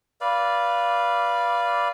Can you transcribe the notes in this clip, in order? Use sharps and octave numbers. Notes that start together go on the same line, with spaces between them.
B4 D5 F5